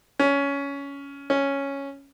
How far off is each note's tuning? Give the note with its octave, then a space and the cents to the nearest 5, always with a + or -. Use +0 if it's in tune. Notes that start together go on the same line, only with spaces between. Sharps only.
C#4 +15
C#4 +0